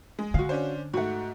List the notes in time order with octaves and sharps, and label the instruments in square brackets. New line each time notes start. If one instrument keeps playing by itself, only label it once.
[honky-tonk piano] G#3
[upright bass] D3 [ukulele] F#4 F5
[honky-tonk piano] C#4 D4 C5
[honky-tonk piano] G#2 A3 [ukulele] F#4 F#5